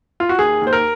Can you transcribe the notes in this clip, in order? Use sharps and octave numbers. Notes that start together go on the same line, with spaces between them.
F4
F#4
D#2 G#4
D#2
C5
A#4